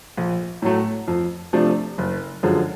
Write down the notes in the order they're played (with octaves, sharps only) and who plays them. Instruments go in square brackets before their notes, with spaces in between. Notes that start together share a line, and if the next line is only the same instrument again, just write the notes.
[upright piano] A#1
A2 F#3 A3
F2
C3 F3 A3 D4
F#1
F#2 D3 F3 G#3